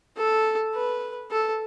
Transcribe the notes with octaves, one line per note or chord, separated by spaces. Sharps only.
A4
B4
A4